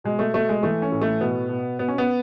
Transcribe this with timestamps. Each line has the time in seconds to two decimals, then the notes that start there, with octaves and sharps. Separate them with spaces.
0.04 B2 G#3
0.19 A3
0.34 B2 A3
0.49 G#3
0.63 E3 A3
0.82 C#4
0.92 A2
1.01 A3
1.21 B2 B3
1.49 B2
1.79 B2 B3
1.88 C#4
1.98 B3